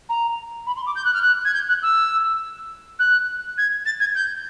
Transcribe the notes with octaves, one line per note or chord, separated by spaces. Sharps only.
A#5
B5
C6
D6
G6
F#6
F6
F#6
G#6
G6
F#6
E6
F#6
G#6
A6
G#6
G6